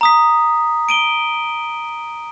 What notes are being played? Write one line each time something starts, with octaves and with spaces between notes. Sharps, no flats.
A#5 D#6 B6
D7 D#7 G7